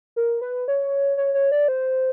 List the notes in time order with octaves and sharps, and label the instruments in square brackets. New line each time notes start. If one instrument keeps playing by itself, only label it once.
[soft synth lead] A#4
B4
C#5
C#5
C#5
D5
C5